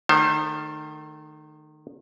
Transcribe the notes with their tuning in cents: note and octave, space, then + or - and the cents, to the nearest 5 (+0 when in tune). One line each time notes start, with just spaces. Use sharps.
D#3 -25 A3 +0 C5 +25